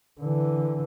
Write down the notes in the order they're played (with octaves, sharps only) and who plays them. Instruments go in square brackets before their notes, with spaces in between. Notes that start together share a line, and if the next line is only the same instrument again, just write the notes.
[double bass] D3 E3